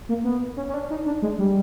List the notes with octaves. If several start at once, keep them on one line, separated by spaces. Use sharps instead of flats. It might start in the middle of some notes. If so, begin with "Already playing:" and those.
A#3
B3
C#4
C#4
D4
D#4
D4
G#3
G3